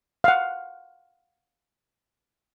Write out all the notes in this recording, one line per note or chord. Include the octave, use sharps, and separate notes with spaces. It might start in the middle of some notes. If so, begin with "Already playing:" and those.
F5 F#5